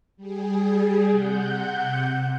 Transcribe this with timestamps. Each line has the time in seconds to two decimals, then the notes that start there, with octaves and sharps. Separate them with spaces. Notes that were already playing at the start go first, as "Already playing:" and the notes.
0.17 G3 G#4
1.10 C3 F#5 G6